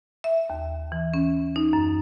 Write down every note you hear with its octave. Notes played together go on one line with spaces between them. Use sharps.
E5
D#2
E3
C#4
D#4
F#2